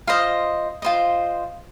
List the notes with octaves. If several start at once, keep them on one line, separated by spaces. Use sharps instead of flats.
F4 C5 D#5 F5
F4 C5 D#5